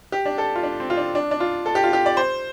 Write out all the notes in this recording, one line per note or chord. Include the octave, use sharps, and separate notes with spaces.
G4
D4
A4
F4
D4
C4
F4
D4
D4
D4
F4
A4
G4
F4
G4
D5
C5